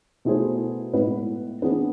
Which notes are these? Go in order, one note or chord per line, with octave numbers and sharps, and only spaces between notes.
B2 A3 E4 G#4 C5
A2 G#3 B3 E4 B4
E3 B3 D4 G#4 B4